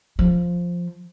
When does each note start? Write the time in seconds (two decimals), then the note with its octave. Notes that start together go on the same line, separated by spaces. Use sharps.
0.19 F3